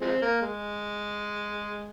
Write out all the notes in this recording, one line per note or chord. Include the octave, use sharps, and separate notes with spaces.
F3 G#3 C4
A#3
G#3